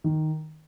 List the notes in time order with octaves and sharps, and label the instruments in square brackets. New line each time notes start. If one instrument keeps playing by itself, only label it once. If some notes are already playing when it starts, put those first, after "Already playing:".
[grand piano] D#3